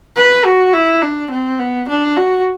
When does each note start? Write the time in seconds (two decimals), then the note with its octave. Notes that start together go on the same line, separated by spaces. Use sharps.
0.16 B4
0.45 F#4
0.73 E4
1.02 D4
1.31 C4
1.59 B3
1.88 D4
2.17 F#4